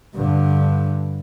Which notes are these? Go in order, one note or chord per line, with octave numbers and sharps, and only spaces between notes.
G2 D3